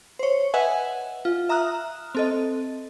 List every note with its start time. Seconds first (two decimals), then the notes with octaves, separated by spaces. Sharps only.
0.19 C5 C#5
0.54 B4 D#5 E5 F#5 G#5
1.25 F4
1.49 E5 A#5 D#6 F6 F#6
2.15 C4 A4 D#5